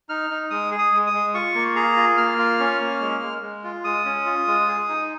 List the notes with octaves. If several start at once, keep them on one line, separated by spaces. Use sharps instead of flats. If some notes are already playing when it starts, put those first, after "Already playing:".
D#4 F6
D#4
G#3 D#6
G#4
D#6
G#3
D#6
G#3
F4 C#6
A#3
G#4 A#5
F4
A#3 F6
F4
C#4
A#3
G#3
G#3
G#3
F4
G#3 D#6
C#4
F4
G#3
G#4
D#4